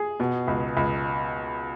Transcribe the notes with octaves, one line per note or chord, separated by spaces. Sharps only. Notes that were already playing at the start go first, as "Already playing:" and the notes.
Already playing: G#4
B2
C#2
C#2